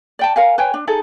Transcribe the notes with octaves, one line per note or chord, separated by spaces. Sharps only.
D5 G5 A5
A#4 F5 G#5
B4 C#5 G5 G#5
D4
D#4 G#4 A4